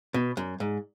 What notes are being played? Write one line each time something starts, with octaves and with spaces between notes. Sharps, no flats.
B2
F#2
G#2